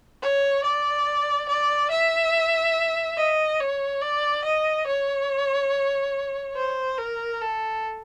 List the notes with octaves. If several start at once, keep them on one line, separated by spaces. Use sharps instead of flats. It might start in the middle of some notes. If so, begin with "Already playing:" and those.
C#5
D5
D5
E5
D#5
C#5
D5
D#5
C#5
C5
A#4
A4